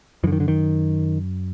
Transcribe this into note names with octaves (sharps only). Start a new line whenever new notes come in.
F#2 D3 E3
D#3
D3
D#3